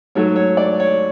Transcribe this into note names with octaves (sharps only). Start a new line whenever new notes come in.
G#2 F#3 A3 C#5
C#5
D5
C#5